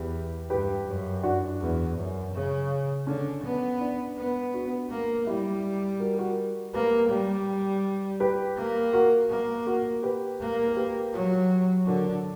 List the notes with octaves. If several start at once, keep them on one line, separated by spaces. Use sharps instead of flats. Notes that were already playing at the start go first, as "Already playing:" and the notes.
Already playing: E2 G4 B4
G2 G4 B4
F#2
D4 F#4
E2
F#2
C#3
D3 C#4
B3
D4
B3
D4 F#4
A#3
G3 E4 G4
F#4 A#4
F#4 A#4
A#3 G4 B4
G3
G4 B4
A#3
F#4 A#4
A#3
F#4 A#4
G4 B4
A#3
A#4
G4 B4
F#3
D3 F#4 A#4
D4 F#4